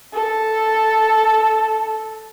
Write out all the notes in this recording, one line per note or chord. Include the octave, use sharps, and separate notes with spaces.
A4